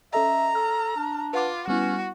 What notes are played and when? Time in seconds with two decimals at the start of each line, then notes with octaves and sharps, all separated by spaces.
0.13 C#4 A4 D#5 E5 A#5
0.55 A4 F6
0.97 D4
1.33 F4 B4 F#5 D6
1.68 G3 B3 C#4 E4 F#4